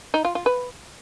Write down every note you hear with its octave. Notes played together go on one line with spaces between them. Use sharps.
D#4
F4
F4
B4